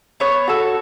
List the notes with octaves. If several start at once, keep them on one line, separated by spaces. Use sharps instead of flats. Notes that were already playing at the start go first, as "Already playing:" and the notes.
B3 C#5
F#4 A4